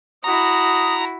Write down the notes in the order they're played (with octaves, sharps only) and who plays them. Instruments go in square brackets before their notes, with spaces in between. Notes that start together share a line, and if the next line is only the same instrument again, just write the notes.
[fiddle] E4 F#4 [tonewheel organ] A#5 [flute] D#6